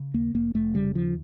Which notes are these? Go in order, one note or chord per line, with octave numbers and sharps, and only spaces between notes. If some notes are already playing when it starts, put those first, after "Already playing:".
Already playing: C#3
D#2 A#3
F1 A#3
F1 A3
C#3 G3
D#2 F3